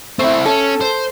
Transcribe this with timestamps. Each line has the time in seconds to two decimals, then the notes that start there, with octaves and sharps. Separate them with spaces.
0.19 A3 C4 E4
0.46 C#4 A4
0.81 C5